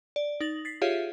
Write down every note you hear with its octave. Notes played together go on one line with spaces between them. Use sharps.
D5
D#4 A6 F#7
A6 B6 C7
F4 G4 G#4 C#5 E5 F5